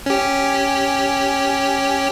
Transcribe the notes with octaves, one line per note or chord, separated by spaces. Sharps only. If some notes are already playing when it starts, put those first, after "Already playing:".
C#4 G4